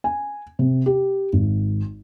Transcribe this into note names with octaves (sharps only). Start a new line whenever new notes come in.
G#5
C3
G4
G#1